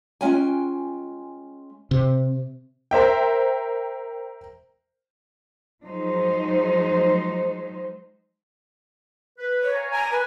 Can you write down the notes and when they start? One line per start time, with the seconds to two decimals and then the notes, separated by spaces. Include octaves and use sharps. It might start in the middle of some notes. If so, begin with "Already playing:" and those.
0.21 G#3 C#4 F4 G5 G#5
1.91 C3
2.91 A#4 C5 E5 G5
5.84 F3 F#3 G#3 D#4 C5
9.38 B4
9.62 C#5
9.74 F5 G#5 A#5
9.91 G#5 A#5
10.11 B4